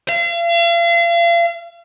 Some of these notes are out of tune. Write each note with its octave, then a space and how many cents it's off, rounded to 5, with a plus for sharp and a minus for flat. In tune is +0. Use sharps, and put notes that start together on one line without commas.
F5 -40